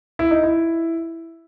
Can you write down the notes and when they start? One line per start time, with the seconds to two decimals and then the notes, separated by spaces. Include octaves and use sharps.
0.19 E4
0.31 D#4
0.43 E4